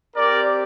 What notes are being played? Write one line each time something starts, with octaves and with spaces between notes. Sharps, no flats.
C4 G4 A#4 D5